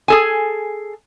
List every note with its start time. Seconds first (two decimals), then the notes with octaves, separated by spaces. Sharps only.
0.08 G#4 A4 G#5